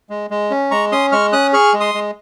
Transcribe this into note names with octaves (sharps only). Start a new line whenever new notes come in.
G#3
G#3
C#4
G#3 A#5 C#6
C#4 C6 D#6
G#3 C#6 F6
C#4 D#6 F#6
G#4 C#6 F6
G#3
C6 D#6
G#3